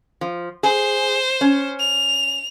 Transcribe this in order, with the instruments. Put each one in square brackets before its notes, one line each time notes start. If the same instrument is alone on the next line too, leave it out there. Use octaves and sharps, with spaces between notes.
[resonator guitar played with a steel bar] F3
[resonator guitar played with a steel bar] G#4 [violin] C5
[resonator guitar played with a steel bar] C#4
[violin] F7